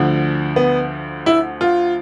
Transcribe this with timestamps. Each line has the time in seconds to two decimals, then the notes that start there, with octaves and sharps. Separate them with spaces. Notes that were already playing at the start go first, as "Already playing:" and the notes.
Already playing: D2 D3 F3
0.56 B3
1.26 E4
1.61 F4